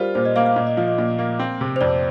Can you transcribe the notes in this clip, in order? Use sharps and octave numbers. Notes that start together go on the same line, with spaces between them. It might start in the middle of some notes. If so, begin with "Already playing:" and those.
Already playing: G3 F4 A#4 C5
A#2 C5
D#5
A#3 F5
F5
A#2 D#5
D#5
F3 F5
D#5
A#2
A#3
C4
C3
C5
F2 D5